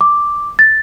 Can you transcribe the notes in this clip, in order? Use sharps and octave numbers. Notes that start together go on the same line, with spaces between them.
D6
A6